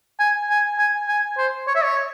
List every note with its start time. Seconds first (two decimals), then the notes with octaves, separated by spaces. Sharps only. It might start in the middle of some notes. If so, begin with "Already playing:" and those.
0.20 G#5
0.50 G#5
0.78 G#5
1.08 G#5
1.38 C5
1.67 C#5
1.75 E5
1.84 C#5